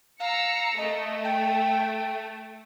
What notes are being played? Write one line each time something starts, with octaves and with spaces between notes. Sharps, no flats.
F5 A#5 E6 C#7
A3 D#5
G5